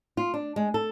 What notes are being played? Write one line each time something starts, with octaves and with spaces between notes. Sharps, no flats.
F4
D4
G#3
A4